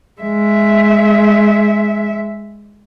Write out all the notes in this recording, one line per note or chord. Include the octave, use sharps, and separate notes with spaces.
G#3 E5